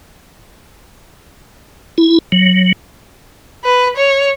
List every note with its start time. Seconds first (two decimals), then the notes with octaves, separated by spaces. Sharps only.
1.98 E4
2.32 F#3
3.64 B4
3.96 C#5